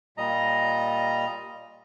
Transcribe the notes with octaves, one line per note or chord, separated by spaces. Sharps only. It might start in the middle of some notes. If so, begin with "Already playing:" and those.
A#2 G3 D#5 A#5